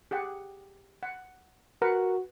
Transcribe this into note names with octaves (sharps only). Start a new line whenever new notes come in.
G4 G#4 F#5
F#5
F#4 A#4 B4 F#5